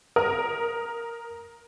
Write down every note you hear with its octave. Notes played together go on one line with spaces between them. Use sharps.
A#4 D#6